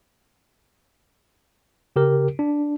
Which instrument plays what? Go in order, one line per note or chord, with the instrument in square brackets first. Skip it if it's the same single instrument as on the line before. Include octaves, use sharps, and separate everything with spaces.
[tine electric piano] C#3 G4 A#4
D4